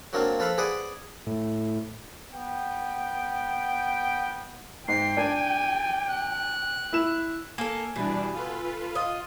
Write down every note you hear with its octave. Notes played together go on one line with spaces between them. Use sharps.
F#3 A#3 C4 D4 F4
F2 A4 B4 F5 B5
G#4 B4 C5 D5 F#5 G#5
A2
B3 G5
G#2 G5 C7
D4 G#5
F#6
E4 E7
A#3 A4 G#5
B2 E3 G3 D4
F4 A4 B4
F4 D#5